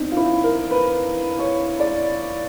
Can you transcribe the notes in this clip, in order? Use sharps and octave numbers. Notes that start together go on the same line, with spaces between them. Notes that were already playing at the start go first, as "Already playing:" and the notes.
Already playing: E2 C4 D4 D#4
F4
E4
A#4
B4
C#5
D5